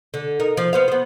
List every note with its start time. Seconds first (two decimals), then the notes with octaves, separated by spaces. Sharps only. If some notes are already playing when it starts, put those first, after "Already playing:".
0.14 D3
0.40 D#4 A#4
0.57 F3
0.73 B3 C5 F5
0.88 B3 C5